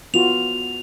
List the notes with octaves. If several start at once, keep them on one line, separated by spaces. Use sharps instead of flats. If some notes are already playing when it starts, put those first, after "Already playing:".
B3 F4 F#4 F7